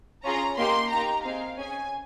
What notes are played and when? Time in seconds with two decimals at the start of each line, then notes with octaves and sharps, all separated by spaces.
0.25 C#4 F4 G#4 A#5
0.58 A#3 D#4 G4 C6
0.91 A#3 D#4 G4 A#5
1.24 C4 D#4 G#4 F5
1.58 C#4 G#4 G#5